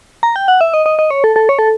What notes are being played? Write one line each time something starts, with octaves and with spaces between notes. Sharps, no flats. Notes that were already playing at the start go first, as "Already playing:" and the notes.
A#5
G5
F#5
E5
D#5
D#5
D#5
C#5
A4
A4
C#5
A4